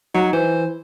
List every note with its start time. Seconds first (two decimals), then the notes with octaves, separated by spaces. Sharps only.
0.14 F#3 D#4
0.33 E3 C5